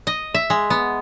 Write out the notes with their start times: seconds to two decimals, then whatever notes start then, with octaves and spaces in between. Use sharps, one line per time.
0.07 D#5
0.34 E5
0.50 G#3
0.70 B3